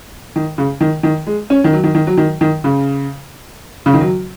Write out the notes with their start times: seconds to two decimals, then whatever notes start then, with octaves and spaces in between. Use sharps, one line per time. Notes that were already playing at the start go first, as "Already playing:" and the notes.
0.36 D#3
0.58 C#3
0.81 D#3
1.03 D#3
1.27 G#3
1.50 C#4
1.64 D#3
1.73 F#3
1.84 D#3
1.95 D#3
2.07 F#3
2.17 D#3
2.41 D#3
2.64 C#3
3.86 C#3
3.94 D#3
4.01 F#3